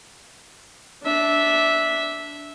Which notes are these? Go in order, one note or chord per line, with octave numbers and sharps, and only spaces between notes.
D4 E5